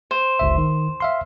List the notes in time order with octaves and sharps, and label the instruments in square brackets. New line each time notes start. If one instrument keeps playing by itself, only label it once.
[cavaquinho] C5
[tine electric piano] G1 C#2 E5
D#3
E5 F5 C6